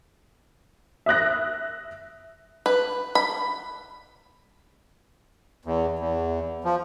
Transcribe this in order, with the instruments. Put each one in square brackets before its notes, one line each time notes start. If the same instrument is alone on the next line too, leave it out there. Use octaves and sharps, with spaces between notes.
[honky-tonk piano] E5 D#6 F#6 A#6
[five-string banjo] B4
B5
[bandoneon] E2
E2
F3